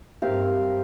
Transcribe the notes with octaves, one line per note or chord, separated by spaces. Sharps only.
G2 C4 G4 A#4 F5